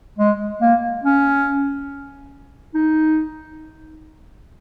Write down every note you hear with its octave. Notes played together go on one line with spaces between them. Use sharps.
G#3
A#3
C#4
D#4